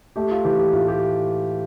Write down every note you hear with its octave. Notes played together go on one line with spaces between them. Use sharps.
A3 G4
F4
E3 G4
G4
A2 F4
G4